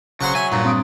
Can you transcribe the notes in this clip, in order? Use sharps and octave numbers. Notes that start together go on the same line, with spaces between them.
C#3 F#3 C5 F#5 C#6
E5 G#5
G2 A#2
C4 D#6 D7